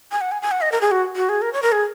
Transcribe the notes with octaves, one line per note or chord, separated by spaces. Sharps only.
G#5
F#5
G#5
G#5
F#5
D#5
A#4
G#4
F#4
F#4
G#4
A#4
C#5
A#4
G#4